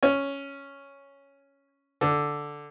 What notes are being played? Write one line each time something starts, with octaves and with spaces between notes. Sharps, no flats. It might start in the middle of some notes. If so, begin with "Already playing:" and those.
C#4
D3